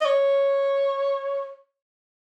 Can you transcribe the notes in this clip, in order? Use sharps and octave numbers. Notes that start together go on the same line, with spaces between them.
D#5
C#5